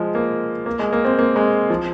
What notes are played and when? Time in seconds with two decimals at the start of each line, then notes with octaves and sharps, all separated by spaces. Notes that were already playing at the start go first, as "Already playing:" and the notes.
Already playing: F3 G#3
0.15 A#3
0.66 A#3
0.79 G#3
0.93 A#3
1.05 C4
1.19 A#3
1.36 G#3
1.70 F3